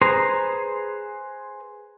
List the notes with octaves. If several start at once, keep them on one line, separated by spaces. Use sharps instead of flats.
G#4 B4 C5 A#5 C6